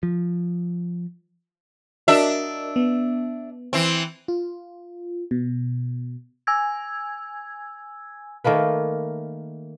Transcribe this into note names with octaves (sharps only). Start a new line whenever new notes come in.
F3
D4 F#4 A#4 D#5 E5
B3
E3 C4
F4
B2
G#5 E6 G#6
D#3 A3 A#3 B4